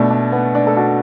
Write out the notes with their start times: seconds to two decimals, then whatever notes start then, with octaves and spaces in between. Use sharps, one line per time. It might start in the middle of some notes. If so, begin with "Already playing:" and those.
Already playing: B2 A3 D4
0.10 D4
0.32 B3
0.55 D4
0.67 A4
0.77 D4 F#4